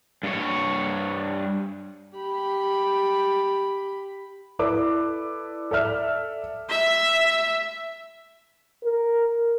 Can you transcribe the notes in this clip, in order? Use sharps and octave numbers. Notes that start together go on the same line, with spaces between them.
G2 C#5
G4 B5
E4 A4 B4 D5 D6
A4 D5 E5 F6
E5
A#4